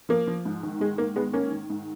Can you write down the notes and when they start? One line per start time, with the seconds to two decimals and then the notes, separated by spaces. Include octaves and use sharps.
0.09 F3 A#3
0.27 F3
0.45 G#2
0.63 D#3
0.80 G#2 G#3
0.98 D#3 A#3
1.16 G#2 G#3 B3
1.33 D#3 A#3 C#4
1.51 D#3
1.70 G#2